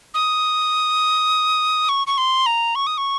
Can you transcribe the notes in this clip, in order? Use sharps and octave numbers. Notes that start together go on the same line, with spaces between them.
D#6
C#6
C#6
C6
A#5
C#6
D#6
C#6